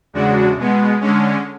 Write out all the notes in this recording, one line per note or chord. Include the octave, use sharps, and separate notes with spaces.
E2 C#3 G#3 D4 F#4
B2 G#3 B3
D3 G#3 C#4